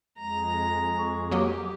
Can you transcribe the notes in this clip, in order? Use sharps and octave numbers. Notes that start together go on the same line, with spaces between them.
F2 G#3 A#5
C#6
F#3 A#3 G4 D#5 D6